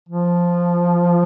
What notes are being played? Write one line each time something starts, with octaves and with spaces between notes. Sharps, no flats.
F3